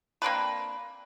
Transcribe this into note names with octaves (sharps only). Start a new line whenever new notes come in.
A#3 C4 D4 B4